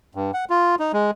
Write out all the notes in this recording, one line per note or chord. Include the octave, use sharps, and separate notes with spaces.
G2
F#5
F4
D#4
G#3